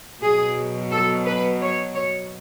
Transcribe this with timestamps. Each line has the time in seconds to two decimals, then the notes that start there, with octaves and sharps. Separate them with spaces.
0.21 B2 F#3 G#4
0.91 A4
1.26 B4
1.61 C#5
1.95 C#5